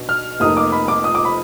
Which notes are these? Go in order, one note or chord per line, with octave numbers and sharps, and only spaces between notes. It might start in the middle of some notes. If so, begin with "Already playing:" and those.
Already playing: B1 B2 D4
F6
F1 F2 F3 A#3 D#4 D#6
D6
B5
D6
D#6
D6
B5